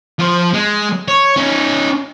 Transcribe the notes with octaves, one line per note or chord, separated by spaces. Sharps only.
F3 C5
G#3
C#5
C#4 D#4